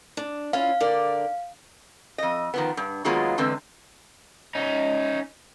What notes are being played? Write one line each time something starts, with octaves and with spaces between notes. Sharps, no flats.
D4
C#4 E4 F4 F5
D3 A#4 D5
F2 D#5
D#3 F3 B3
G2
D#3 F#3 G#3 A#3 B3 F4
E2 D3 G#3 C4 B4
C#4 D#4